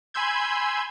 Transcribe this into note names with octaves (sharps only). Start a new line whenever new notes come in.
G#5 B5 C6 E6 G6 G#6